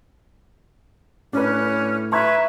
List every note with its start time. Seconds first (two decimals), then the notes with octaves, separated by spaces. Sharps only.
1.33 A2 C#4 D4 B4
2.12 B4 E5 A#5 C#6 G#6